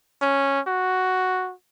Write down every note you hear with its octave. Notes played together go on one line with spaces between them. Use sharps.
C#4
F#4